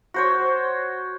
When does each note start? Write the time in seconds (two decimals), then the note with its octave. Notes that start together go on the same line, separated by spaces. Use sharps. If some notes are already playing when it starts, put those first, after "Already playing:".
0.14 F#4 C5 C#5